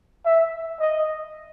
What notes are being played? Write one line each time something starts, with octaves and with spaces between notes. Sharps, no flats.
E5
D#5